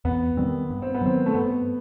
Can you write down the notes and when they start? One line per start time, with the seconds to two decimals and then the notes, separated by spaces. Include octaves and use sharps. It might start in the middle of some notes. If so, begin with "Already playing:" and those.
0.05 E2 B3
0.37 D#3 G3 C4
0.70 G2
0.82 C4
0.94 B3
1.02 D#3 F#3 C4
1.26 A3
1.34 G2 B3